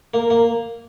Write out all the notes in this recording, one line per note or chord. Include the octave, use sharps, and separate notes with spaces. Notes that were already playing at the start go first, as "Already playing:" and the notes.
A#3 A#4
A#3